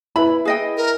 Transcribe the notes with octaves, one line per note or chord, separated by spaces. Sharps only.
E4 B4 B5
G#4 D#5 G5
A#4